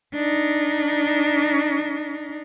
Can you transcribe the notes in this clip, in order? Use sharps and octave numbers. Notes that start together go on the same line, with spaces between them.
D4 D#4